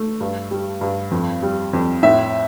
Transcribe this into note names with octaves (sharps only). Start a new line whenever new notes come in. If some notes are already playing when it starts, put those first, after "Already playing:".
Already playing: A3
G2
G3
G2
F2
G3
F2
A2 E5